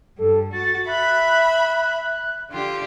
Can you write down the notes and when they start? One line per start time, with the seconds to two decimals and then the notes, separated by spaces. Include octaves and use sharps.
0.19 G2 A4
0.52 F#4 A6
0.88 E5 B5 F#6
2.51 D3 F4 G4